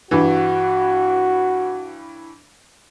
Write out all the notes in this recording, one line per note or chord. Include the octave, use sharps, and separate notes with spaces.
G2 E3 F#4